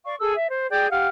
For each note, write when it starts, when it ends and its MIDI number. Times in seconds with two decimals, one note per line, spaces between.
0.05 0.15 74
0.05 0.15 77
0.05 0.15 85
0.19 0.34 68
0.19 0.34 69
0.19 0.34 88
0.34 0.47 76
0.48 0.67 72
0.70 0.88 68
0.70 0.88 74
0.70 0.88 79
0.70 0.88 91
0.90 1.07 67
0.90 1.07 77
0.90 1.07 78
0.90 1.07 89